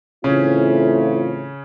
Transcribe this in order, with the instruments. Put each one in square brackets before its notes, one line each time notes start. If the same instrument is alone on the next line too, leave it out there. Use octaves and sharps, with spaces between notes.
[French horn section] A2 E3 A3 C4 F4 [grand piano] C#3 C#4